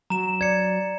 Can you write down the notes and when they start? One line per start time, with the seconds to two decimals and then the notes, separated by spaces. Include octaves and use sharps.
0.10 F#3 A#5 E7
0.41 D5 G#6 C#7